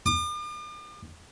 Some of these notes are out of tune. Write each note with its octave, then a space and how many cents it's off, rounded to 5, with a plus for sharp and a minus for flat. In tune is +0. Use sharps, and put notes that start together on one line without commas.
D6 +45